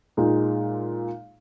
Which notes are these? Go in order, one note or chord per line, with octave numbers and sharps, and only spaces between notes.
A#2 G#3 D#4